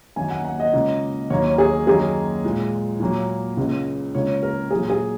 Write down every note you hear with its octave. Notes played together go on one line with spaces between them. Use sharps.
F#2 D#3 A#3 G#5
F#5
F#5
D#5
C#2 C#3 A#3
D#2 D#3 F#3 A#3 C#5
G#4
F#2 D#3 F#3 A#3 G#4
A#2 G#3
A#2 F#3 A#3
C#2 C#3 G#3
C#2 C#3 A#3 C#5
A#4
A#2 F#3 A#3 G#4
G#4